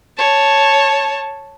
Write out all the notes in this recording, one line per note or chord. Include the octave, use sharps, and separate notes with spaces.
C#5 A5